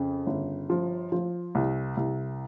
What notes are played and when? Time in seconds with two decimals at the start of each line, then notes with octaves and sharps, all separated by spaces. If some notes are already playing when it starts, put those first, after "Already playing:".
Already playing: F2 C#3
0.26 G1
0.70 F3
1.12 F3
1.55 C2
1.97 C2